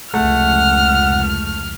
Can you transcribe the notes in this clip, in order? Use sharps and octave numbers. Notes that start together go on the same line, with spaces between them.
F1 C#2 A3 F#5 F6